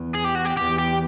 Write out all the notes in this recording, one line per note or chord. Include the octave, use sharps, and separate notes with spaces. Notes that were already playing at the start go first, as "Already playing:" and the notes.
Already playing: E2
G#4
G4
F#4
G4
E2 G4
G4